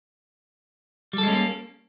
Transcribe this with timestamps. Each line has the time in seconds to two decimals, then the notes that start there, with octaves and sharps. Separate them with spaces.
1.13 G3
1.18 A4
1.23 G#3
1.28 C#4
1.33 A#3